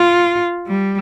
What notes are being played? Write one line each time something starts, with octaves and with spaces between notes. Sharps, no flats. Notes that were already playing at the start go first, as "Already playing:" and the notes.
Already playing: F4
G3